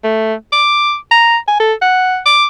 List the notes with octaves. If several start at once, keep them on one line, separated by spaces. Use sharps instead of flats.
A3
D6
A#5
G#5
A4
F#5
D6